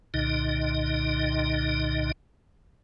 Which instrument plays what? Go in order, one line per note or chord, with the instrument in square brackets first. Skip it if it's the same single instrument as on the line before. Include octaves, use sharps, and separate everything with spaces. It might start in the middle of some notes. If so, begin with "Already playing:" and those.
[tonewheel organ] C2 A#2 D3 D#4 D#5